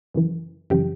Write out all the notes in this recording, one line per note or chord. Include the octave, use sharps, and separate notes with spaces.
F#2 C#3 E3
F#2 C#3 E3 G4